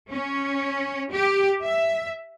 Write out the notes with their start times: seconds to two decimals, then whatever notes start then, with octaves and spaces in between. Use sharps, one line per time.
0.11 C#4
1.12 G4
1.64 E5